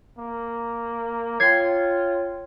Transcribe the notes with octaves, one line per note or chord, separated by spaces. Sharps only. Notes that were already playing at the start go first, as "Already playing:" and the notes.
A#3
F4 C#5 G5 G#6 C7